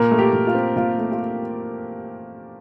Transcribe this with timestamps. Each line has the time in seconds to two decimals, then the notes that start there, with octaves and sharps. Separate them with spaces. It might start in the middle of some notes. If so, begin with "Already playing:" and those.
Already playing: A#2 A#4
0.11 A3
0.19 G4
0.33 A#2
0.47 F4
0.55 C4
0.76 A#2 F4
0.98 A3
1.12 F4